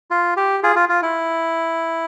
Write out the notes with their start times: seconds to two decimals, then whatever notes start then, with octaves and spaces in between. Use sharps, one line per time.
0.11 F4
0.37 G4
0.63 F4 G#4
0.76 F4
0.89 F4
1.02 E4